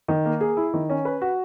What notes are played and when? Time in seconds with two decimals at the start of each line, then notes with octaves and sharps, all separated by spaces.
0.08 D#3
0.25 A#3
0.41 G#4
0.57 E4
0.74 D#3
0.89 C#4
1.05 B4
1.21 F#4